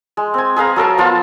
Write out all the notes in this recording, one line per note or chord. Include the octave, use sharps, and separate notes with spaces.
G#3
C4 G#5
G#4 B4 F5 A#5
F#3 A4 A#4 A5
F3 B3 F4 F5